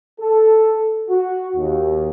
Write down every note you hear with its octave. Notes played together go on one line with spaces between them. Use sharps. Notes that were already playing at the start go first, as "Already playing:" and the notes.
A4
F#4
D#2